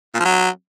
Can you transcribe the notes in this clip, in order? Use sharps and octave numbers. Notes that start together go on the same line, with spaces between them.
A#2
F3
F#3